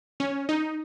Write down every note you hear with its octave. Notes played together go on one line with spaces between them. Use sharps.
C#4
D#4